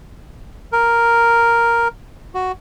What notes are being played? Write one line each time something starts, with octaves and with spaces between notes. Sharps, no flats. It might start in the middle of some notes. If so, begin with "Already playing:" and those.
A#4
F#4